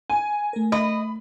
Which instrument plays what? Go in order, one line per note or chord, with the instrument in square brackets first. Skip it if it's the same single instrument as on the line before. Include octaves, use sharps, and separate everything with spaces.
[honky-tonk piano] G#5
[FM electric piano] A3 A#4
[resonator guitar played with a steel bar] D#5 [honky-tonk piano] B5